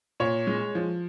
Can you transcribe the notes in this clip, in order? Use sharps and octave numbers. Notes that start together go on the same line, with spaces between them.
A#2 C#5
G#3
F3